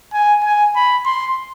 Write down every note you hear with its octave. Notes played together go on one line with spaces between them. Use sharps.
G#5
G#5
B5
C6